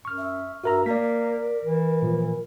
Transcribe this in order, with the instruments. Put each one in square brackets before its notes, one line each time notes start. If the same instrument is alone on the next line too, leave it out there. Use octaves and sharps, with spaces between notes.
[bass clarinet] F#2 [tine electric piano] C#6 F6
[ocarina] E5
[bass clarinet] G2 [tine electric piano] F#4 A#4 A#5 [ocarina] E5
[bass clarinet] A#3 [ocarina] A#4 [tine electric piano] D5 B6
[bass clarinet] E3
[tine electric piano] A#2 F3